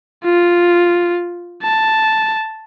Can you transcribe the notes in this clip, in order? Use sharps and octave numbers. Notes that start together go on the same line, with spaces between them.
F4
A5